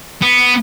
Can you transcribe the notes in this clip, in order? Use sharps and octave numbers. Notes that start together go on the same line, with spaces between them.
B3